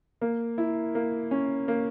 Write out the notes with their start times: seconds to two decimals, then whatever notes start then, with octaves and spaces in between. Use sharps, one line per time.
0.22 A#3
0.58 E4
0.95 A#3
1.31 C#4
1.68 A#3